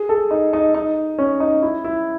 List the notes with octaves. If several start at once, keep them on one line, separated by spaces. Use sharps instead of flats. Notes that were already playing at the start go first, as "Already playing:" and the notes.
Already playing: G#4
A4
D#4
D#4
D#4
C#4
D#4
E4
E4